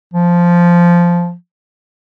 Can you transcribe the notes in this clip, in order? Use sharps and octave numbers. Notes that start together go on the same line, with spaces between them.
F3